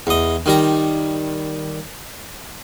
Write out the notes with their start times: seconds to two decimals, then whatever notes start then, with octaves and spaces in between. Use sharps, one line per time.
0.07 E2 D#5
0.46 D#3 G3 A#5